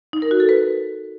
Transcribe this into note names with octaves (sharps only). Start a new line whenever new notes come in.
D#4
A#4
F#4
A4
B4